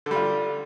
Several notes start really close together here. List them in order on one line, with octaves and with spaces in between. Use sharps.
D3 G3 F4